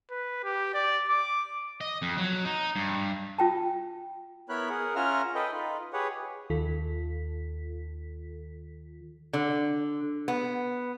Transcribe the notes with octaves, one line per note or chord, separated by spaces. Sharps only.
B4
G4
D5
D6
D#5
F2
F#3
D#4
G2
F4 G5 A5
B3 E4 A#4 C#5 B5 F#6
G#4 A#4 F#5
C#4 F4 E5 F#5 A#5 F6
A4 B4 D#5 G5
D#4 F4 B4
G4 G#4 B4 C#5 F#5
D#2 D#3 F4 A4 B6
D3
B3